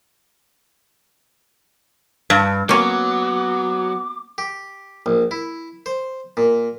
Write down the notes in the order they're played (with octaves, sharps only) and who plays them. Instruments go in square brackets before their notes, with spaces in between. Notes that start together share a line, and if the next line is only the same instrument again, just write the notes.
[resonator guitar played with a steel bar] G2
[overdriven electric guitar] F#3 [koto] A#3 C#4 [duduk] B3 [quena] D6
[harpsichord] G4
A#1
E4
C5
A#2